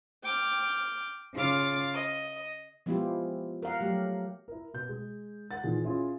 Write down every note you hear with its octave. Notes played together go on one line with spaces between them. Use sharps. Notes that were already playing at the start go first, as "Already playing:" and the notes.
G5 D6 F6
C#3 F4 F5 D6 A6
D#5
F3 G#3 B3 E4 F4 G4
A#4 F5 F#5
F#3 A3 G4
E4 A#4
B2 G6
G#3
A#4 F#5 A6
A#2 D#3 E3 G#4
C#4 E4 F4 G#4